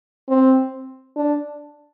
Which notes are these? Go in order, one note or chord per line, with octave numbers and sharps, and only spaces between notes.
C4
D4